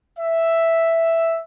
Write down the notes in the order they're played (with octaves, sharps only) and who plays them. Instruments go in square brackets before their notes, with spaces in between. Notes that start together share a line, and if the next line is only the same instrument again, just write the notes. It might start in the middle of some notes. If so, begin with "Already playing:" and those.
[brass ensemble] E5